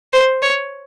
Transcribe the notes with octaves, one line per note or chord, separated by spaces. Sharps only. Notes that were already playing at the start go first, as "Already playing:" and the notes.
C5
C#5